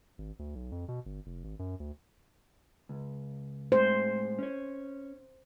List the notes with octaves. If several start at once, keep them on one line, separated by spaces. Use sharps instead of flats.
G#1
D2
B1
F2
B2
G1
F1
G#1
F#2
D2
C#2
A2 G#3 C5
C#4 C#5